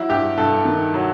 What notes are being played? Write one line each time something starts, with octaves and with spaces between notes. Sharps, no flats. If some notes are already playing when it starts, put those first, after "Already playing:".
Already playing: F#3 E4
G2 G4
G2 A4
D#3
F#3